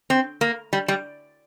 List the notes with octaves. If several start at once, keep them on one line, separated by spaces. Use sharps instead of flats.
C4
A#3
G3
G3